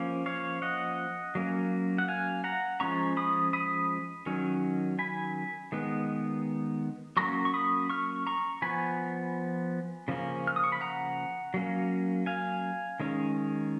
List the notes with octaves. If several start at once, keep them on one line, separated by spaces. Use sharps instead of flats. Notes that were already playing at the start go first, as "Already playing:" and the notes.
Already playing: F3 A#3 C#4
C#5 F5
D#5 F#5
F#3 A#3 C#4
F#5
F5 G#5
F#5 A#5
F3 G#3 C#4 A#5 C#6
B5 D#6
B5 D#6
D#3 F#3 C#4
G#5 B5
D#3 G#3 B3
F#3 A#3 C#4 A#5 C#6
C#6
B5 D#6
C#6 F6
A#5 C#6
F3 B3 G#5 B5
C#3 F3 A#3 C#4
F6
D#6
C#6
B5
F#5 A#5
F#3 A#3 C#4
F5 G#5
D#3 G#3 C#4